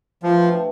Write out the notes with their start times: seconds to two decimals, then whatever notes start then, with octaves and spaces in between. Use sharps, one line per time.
0.23 A2 E3 F3 G3 D4